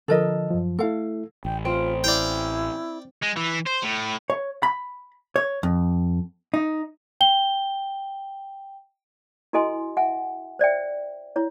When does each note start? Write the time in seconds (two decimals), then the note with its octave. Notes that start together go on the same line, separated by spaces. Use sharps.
0.08 D3 F3 A4 A#4 D#5
0.51 F#2 F3
0.79 A3 E4 A4 F5
1.45 A1 G5
1.65 C4 F4
2.04 E4 D5 F5 G5
3.23 G#3
3.37 E3
3.67 C5
3.83 A2
4.30 C#5
4.63 B5
5.36 C#5
5.63 F2
6.54 D#4
7.21 G5 G7
9.53 E4 F#4 A4 D#5 G#5 C6
9.97 E5 F#5 G#5
10.59 C5 D5 E5 G5
11.36 E4 C#5